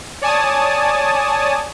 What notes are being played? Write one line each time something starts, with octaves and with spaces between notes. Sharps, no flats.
C#5 D5 G#5 A5 D#6